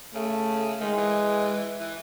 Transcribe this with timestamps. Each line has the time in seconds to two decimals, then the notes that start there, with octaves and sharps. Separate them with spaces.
0.15 C#3 A3
0.81 D#3 G#3
0.97 E3
1.80 E3